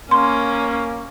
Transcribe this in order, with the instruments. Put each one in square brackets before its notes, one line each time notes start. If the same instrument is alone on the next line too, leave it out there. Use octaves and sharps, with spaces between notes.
[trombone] A#3 [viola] C#4 [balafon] C6